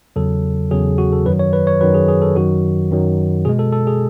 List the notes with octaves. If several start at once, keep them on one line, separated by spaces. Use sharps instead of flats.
E2 C#3 F#3 A4
E2 C#3 F#3 G#4
F#4
A4
F#2 D#3 F#3 B4
C#5
B4
C#5
F#2 D#3 F#3 B4
G#4
G#4
A4
F#2 D#3 F#3 F#4
F#2 D#3 F#3
B2 G#3 G#4
A4
A4
G#4